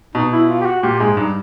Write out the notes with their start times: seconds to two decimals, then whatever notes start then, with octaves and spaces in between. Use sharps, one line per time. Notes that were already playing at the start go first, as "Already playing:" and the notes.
0.15 B2 D#4
0.32 E4
0.49 F4
0.61 G4
0.66 F#4
0.83 A#2 G4
0.99 G#2 G#4
1.16 G2 D#4